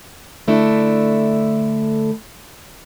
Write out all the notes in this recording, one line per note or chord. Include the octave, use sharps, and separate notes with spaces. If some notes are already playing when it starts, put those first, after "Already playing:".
D3 A3 D4 E4